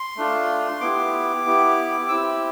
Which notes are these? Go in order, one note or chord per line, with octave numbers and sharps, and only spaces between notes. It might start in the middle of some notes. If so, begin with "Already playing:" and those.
Already playing: C6
A3 D4 F4
B3 E4 G4 D6
B3 E4 G4
C4 E4 G4 E6